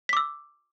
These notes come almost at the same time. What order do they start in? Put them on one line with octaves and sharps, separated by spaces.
B6 D6 E6